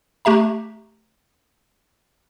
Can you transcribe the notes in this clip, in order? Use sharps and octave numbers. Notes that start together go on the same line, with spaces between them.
A3 G4 E5 A#5